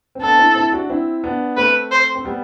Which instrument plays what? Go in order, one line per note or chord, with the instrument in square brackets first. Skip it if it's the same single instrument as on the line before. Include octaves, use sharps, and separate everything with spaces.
[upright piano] C4
[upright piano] B3 D4 [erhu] A4
[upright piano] C4 E4
C4 E4
D4 F#4
C4 E4
B3 D4
[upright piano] A3 C4 [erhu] B4
[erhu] C5
[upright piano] C4
G3 B3